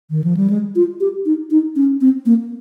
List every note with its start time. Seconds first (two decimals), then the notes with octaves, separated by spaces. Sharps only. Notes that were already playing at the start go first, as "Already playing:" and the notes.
0.10 D#3
0.24 F3
0.37 G3
0.50 G#3
0.76 F4
1.00 G4
1.26 D#4
1.51 D#4
1.76 C#4
2.01 C4
2.26 A#3